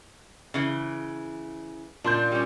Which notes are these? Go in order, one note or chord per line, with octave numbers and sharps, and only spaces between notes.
C#3 E3
A#2 D4 C6 G6
G3 C#4